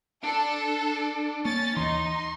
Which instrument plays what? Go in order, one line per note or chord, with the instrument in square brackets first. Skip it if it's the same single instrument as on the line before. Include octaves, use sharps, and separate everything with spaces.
[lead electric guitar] D4 [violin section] A4
[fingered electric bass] A#3 [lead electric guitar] C#4 [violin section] A6
[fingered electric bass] D#2 E3 [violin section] D#4 [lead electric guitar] C6